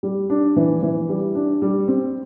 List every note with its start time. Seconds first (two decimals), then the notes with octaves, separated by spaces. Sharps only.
0.03 G3
0.30 D4
0.56 E3
0.83 E3
1.09 G3
1.35 D4
1.62 G3
1.88 C4